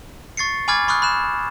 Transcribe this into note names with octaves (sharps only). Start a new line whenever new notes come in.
C#6 A6 C7 C#7
G#5 B5 D6 F6 G#6 A6
B5 C#6 D#6 F6 F#6
B5 F#6 E7